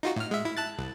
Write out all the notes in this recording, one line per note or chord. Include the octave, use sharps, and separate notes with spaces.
D#4 F4 F#4
A2 F6
G#3 E5
E4
A5 F#6 A6
C2